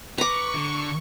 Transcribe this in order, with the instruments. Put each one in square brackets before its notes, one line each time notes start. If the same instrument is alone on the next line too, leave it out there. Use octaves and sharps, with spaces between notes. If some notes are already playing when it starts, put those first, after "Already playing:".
[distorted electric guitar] B4 [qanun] A#5 D6 [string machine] C#6
[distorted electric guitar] D3